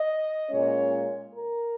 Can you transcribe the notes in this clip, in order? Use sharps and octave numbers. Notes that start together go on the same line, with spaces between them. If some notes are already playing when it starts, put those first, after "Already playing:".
Already playing: D#5
A#2 G#3 C#4 C#5
A#4